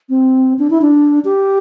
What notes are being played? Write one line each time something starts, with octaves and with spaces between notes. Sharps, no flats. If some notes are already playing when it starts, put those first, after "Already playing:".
C4
D4
E4
D4
G4